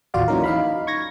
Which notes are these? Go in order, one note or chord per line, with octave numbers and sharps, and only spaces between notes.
A1 D#2 F4 F#4 D5 F5
E3 F#3 A#3 C#4 D#4 A#4
D#4 F5 B5
C#6 G#6 A#6